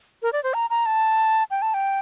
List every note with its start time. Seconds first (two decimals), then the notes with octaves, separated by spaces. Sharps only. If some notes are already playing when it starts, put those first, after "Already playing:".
0.23 A#4
0.33 D5
0.44 C5
0.54 A#5
0.70 A#5
0.86 A5
1.51 G5
1.62 A5
1.74 G5